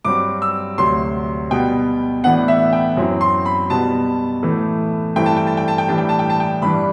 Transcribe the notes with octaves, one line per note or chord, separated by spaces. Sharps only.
G2 F#3 C4 D6
E6
D2 C3 F#3 C6
B2 G3 B3 G5
A2 E3 B3 D4 F#5
E5
G5
F#2 F#3 C4 E4
C6
B5
B2 G3 B3 A5
A2 E3 A3
G2 E3 A3 C4 E4 G5
A5
G5
A5
G5
A5
G5
A2 E3 G3 D4 A5
G5
A5
G5
A5
G5
G2 E3 G3 D4 B5